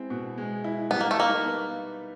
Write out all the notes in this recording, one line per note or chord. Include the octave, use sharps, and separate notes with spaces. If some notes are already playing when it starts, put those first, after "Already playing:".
Already playing: G#3 C4 E4
B2
G#3
E4
G3 B3
A#3
A3
A#3 D#4
B3